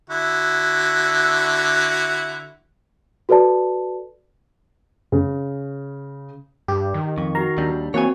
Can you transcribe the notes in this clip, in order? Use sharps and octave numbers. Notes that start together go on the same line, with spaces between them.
D3 E4 F#4
F#4 A4 B4 D5 A5
C#3
G2 G4
D#3
F2 C#6
F#4 A#4 A#5
D#2 G3 D4
E3 A#3 C4 F#4 C#5 G#5